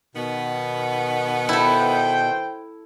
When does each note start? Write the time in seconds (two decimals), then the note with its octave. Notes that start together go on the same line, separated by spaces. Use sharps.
0.15 B2 D#3 B3
1.49 E4 A4 C5 G5